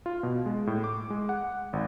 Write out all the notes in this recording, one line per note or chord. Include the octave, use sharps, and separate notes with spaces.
F4
B2
G#3
A2
D6
G#3
F#5
G#1